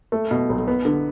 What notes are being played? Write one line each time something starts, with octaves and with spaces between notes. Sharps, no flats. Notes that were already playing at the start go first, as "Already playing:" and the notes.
A3
B2
B1
B3
D3